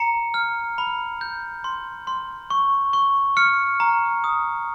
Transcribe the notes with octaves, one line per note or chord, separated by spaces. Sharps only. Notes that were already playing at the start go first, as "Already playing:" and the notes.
Already playing: A#5 C#7
F6
B5
G6
C6
C6
C#6
C#6
F6 C#7
A#5
D#6